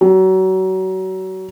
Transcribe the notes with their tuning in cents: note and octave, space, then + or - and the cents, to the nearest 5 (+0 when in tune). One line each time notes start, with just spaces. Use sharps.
F#3 +30